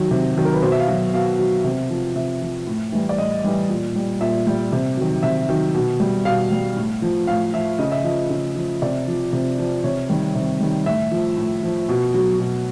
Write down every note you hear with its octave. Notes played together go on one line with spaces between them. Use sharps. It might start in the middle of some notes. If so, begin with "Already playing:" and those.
Already playing: D#3 F#3
C3
D#3 F#3
A#4
B4
B2 C5
E5
F5
F#3
B2 F5
F#3
C3
F3
C3 E5
F3
A2
E3 G3
D5
A2 D#5
E3 G3
A#2
G3
A#2 E5
G3
C3
D#3 F#3
C3 E5
D#3 F#3
B2
G3
B2 F5
G3
A2
F3
A2 F5
F3 E5
C#3 D#5
E5
F3 D#5
C#3
F3
C3 D5
F3
C3
F3
C3 C#5
D#3 G3
C3
D#3 G3
A2 E5
F3
A2
F3
B2
F#3
B2